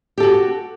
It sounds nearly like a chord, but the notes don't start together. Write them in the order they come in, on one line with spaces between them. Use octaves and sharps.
G4 A4 F#4